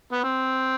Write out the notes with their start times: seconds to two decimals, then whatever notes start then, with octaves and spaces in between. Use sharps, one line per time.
0.12 B3
0.24 C4